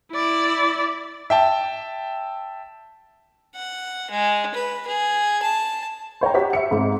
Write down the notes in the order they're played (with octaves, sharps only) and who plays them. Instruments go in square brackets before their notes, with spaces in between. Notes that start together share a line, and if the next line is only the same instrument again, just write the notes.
[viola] E4 D5
[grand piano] E5 G5 A5
[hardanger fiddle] F#5
G#3
B4
G#4
A5
[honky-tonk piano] C5 C#5 G5 A#5
F#4 G4 C#5 B6
E5 C#7
G#2 C4